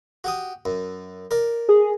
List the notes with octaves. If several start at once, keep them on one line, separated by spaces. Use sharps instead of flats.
F#4 G4 D#6
F#2
A#4 D5
G#4